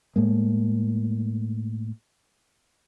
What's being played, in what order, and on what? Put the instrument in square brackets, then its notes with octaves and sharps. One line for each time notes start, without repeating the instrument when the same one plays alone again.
[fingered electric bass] A2 G#3 A#3